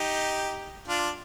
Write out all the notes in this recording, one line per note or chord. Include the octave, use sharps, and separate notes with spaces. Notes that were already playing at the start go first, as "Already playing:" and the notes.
Already playing: D#4 G4
D4 F4